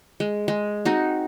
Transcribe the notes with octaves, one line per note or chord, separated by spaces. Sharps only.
G#3
G#3
C4 D#4 F#4